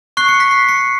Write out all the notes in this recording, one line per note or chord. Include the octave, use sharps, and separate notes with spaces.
C#6 F#6 C7
C#7
B6
C7
C#7